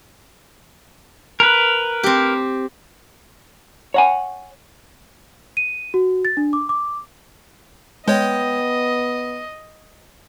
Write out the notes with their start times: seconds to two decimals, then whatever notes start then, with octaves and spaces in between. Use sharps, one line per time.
1.40 A#4 B4
2.03 C4 G4
3.94 C#5 F#5 G#5
5.57 D#7
5.94 F#4
6.25 A6
6.37 D4
6.53 D6
6.69 D6
8.08 G#3 B3 C#5 D#5 G5